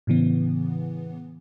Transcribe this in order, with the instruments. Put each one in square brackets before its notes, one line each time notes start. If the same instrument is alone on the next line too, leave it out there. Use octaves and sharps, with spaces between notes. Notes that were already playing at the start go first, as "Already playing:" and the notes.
[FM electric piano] A2 C#3 E3 B3